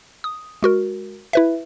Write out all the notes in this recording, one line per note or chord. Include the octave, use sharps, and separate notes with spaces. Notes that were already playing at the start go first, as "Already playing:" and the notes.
D#6
G#3 F#4 A#4
E4 B4 E5